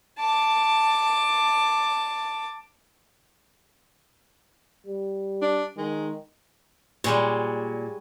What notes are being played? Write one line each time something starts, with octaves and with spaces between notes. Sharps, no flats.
A5 D6
G3
D4
D#3 G#3
A#2 G3 G#3 C#5